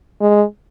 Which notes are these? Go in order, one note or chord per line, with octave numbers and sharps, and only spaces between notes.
G#3